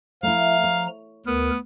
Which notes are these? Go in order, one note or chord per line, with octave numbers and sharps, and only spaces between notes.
F3 A3 E4 F5 A#5
C#5
D2 B3 A#4